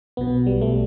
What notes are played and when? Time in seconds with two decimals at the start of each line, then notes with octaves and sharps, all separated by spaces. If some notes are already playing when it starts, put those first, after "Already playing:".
0.17 B1 B2 B3
0.47 G3
0.61 A3